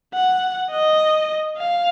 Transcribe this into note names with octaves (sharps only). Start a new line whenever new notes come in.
F#5
D#5
F5